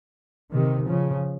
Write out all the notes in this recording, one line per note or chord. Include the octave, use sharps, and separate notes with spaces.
C3 D#3
C#3 F3